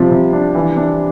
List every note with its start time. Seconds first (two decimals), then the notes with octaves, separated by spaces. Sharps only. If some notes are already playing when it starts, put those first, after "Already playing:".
Already playing: C3 F3 G3
0.11 C3
0.33 D4
0.55 E3
0.77 D4